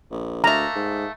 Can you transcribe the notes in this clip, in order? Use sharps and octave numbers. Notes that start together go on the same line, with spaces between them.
A#1
D2 A3 A#3 A#5
G#2